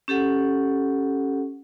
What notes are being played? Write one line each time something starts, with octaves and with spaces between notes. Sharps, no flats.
C#4 G4 A4 F#5